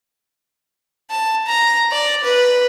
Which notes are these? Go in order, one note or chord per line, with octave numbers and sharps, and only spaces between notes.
A5
A#5
D5
B4